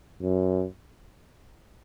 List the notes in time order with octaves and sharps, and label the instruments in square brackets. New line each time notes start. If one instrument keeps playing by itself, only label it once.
[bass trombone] F#2